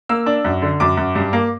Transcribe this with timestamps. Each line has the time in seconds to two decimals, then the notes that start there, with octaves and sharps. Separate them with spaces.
0.09 A#3 E6
0.26 D4
0.45 F#2
0.62 D3
0.80 F#2 D6
0.97 F#2
1.15 G2
1.33 A#3